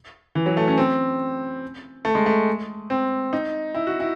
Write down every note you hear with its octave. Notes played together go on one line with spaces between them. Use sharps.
E3
F#3
A3
C#4
C4
A3
G#3
A3
C4
D#4
E4
F#4
E4